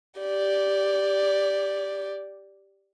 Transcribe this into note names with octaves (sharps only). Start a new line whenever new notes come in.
G4 D5